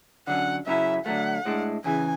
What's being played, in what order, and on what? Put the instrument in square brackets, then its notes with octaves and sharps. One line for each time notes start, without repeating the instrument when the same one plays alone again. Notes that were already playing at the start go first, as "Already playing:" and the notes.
[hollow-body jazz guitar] D3 F#3 C#4 [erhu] F#5
[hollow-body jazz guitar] F#2 C#3 F#3 C#4 E4 [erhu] E5
[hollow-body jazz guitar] D3 F#3 A3 [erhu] F#5
[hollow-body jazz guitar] A2 G#3 D4
[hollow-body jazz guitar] E2 C#3 E3 [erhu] G#5